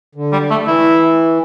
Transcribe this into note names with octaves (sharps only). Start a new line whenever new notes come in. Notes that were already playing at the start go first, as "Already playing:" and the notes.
D3
G3
A3
E3 E4